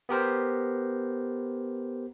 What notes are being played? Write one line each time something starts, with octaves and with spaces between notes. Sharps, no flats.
B3 G4 A#4 C5